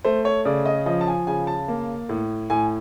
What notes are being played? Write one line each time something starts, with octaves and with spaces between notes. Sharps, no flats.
A3 C5
C#5
C#3 D5
D#5
F3 D#5
A5
G#5
C#3 G#5
A5
A#3
A2
A2 G#5